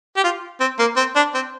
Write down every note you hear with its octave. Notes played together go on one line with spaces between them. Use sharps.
G4
F4
C4
A#3
C4
D4
C4